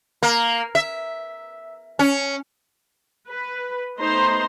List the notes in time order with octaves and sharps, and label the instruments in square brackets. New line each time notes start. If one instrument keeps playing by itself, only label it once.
[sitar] A#3
E5
C#4
[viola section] B4
A3 B3 D#4 C5 A#5 C6